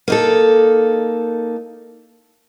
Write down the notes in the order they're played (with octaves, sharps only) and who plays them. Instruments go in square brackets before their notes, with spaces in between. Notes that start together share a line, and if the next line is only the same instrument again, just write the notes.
[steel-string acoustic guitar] A#3 D#4 A4